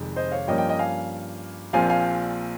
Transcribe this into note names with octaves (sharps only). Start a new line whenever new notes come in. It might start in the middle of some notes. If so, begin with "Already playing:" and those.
Already playing: F1 F2 C3 D#3 G#3
C5 D#5
C#5 F5
G2 F3 A#3 C#4 D#5 G5
D#5 G5
D#5 G5
F5 G#5
A#1 A#2 F3 C4 F5 G#5
F5 G#5